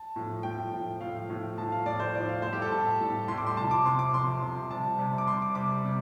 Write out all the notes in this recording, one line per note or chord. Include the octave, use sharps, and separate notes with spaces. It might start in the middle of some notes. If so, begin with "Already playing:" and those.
Already playing: A5
A2 F3
A2 F3 G5
A2 F3
A2 F3 F5
A2 F3
A2 F3 A5
F5
A2 F3 D5
C5
A2 F3 D5
F5
A2 G3 C5
G4
A4
A2 G3 A5
A2 G3
A2 G3 C6
D6
C6
C3 F3 A5
D6
C3 F3 C6
D6
C3 F3 C6
C3 F3
C3 G3 A5
C3 G3
D6
C3 G3 C6
D6
C3 G3 D6
C3 G3